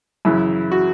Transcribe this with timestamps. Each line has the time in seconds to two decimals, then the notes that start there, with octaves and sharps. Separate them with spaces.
0.25 F#2 C#3 E3 E4
0.72 F#4